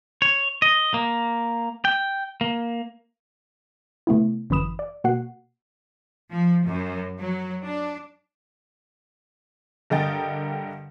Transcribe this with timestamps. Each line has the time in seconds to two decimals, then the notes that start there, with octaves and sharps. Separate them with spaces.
0.22 C#5
0.62 D#5
0.94 A#3
1.85 G5
2.41 A#3
4.07 C3 A3 B3 E4
4.50 G1 F#2 E3 B5 D#6 E7
4.79 D5
5.04 B2 A#3 F#4 F#5 C7
6.31 F3
6.65 F#2
7.19 F#3
7.64 D4
9.90 G2 D3 A#4 D#5 G5 A6